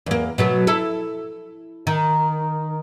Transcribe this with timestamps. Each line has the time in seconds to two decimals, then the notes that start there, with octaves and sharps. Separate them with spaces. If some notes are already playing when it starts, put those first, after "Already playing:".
0.06 E2 A#3
0.38 B2 F#3 A3
0.67 E4 A4
1.87 D#3